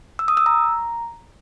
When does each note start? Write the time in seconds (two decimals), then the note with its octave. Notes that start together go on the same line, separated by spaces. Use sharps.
0.19 E6
0.28 D#6
0.37 E6
0.46 A#5